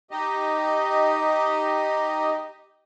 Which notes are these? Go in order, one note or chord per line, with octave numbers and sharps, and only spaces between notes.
D#4 G4 D#5